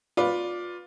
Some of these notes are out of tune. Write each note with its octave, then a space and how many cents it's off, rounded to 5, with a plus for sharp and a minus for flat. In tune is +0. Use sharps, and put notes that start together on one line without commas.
F4 +20 B4 +0 D5 +0